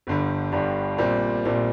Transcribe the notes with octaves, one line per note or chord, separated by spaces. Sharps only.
G1 G2 D3 G3
G1 G2 D3 G3
A#1 A#2 G3 C4
A#1 A#2 G3 C4